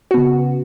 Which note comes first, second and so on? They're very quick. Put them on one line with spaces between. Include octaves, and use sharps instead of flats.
F#4 B3 C#3